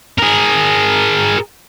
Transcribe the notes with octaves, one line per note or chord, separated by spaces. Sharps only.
G#4 A#4